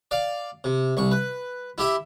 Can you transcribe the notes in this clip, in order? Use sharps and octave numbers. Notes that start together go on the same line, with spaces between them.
D5 F5
C3
C2 C#6
B4
E4 G4 E5